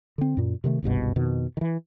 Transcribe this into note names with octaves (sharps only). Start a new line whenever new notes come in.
D3 C4
F#2 A#2
C3 D#3 G#3 A3
F#1 C2 G2 B2
F2 B2 D#3
D#3 E3